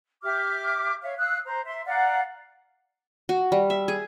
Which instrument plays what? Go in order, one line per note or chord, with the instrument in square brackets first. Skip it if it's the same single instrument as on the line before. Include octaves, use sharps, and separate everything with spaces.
[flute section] G4 E5 D6 F6
C#5 E5 F5
F5 D#6 E6 F#6
C5 A#5
E5 C6
D5 F5 F#5 A#5
[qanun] F#4
G3
E5
G#4